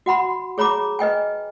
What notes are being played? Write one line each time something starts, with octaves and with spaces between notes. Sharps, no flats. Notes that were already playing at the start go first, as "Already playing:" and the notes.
F#4 F#5 B5 C6
G#4 C#5 A#5 B5 D6
B4 D#5 G5 G#5